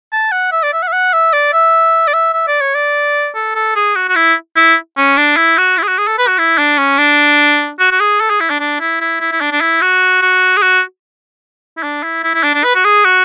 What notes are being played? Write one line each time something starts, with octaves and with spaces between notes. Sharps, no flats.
A5
F#5
E5
D5
E5
F#5
E5
F#5
E5
D5
E5
D5
E5
E5
D5
C#5
D5
A4
A4
G#4
F#4
F#4
E4
E4
C#4
D4
E4
F#4
E4
G#4
F#4
G#4
A4
B4
F#4
E4
D4
C#4
D4
F#4
F#4
G#4
A4
G#4
E4
D4
D4
E4
E4
E4
E4
D4
D4
E4
F#4
F#4
G#4
F#4
E4
D4
E4
E4
E4
D4
D4
B4
F#4
G#4
F#4